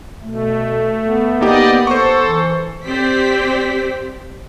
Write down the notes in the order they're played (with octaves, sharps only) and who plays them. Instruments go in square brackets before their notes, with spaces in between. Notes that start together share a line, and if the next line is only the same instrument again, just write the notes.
[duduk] B2 [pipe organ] A3
[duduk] B3
[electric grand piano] A#3 D#4 G4 [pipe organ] D5 D#5
[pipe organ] A4 [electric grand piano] C5 C#6
[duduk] E3
[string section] C4 G4 C5 D5 B6